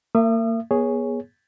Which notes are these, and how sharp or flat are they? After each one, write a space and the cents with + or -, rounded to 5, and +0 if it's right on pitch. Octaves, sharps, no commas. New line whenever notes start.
A#3 -30 E5 +35 D#6 -35
B3 -35 G#4 +0 C#5 +0